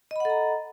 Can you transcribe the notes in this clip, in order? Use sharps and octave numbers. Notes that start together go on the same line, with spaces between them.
A4 D#5 F#5 A#5 B5